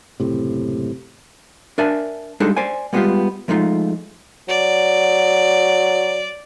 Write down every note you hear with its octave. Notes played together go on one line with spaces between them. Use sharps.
F#1 A2 C3
D4 A#4 D5 E5 G#5 A5
G3 G#3 D4 D#4 G#4 A4
C5 D5 G#5
G3 G#3 B3 D4 F4 G4
F3 G#3 A3 D#4 F4
F#3 D5